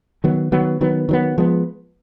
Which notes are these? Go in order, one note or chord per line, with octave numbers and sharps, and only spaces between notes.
D#3 F#3 B3
D#3 F#3 B3
D#3 F#3 B3
D#3 F#3 B3
F3 G#3 B3